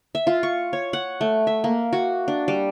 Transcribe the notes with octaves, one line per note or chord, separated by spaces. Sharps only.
E5
F4
C#6
C#5
F#5
A3
E5
A#3
F#4
D4
G3